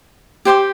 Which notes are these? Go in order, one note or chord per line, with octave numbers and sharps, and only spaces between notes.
G4 C5 G5 D6